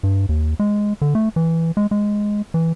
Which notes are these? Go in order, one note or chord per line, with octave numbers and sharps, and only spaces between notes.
G2
D#2
G#3
D3
A3
E3
G#3
G#3
E3